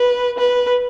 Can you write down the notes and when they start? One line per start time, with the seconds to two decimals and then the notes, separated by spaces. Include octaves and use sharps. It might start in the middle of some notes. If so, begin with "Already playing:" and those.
Already playing: B4
0.38 B4